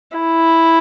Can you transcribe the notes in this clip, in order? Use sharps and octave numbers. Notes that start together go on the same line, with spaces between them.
E4